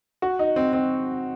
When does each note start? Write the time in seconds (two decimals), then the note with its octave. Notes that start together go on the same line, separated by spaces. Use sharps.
0.22 F#4
0.39 D#4
0.56 C4
0.73 C4